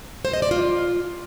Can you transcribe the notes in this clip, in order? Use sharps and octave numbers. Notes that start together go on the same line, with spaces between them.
C5
D#5
D5
F4